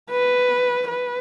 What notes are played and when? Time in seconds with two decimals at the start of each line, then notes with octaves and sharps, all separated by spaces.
0.11 B4
0.89 B4